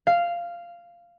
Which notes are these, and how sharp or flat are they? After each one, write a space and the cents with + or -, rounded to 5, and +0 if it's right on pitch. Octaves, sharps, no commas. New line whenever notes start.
F5 -10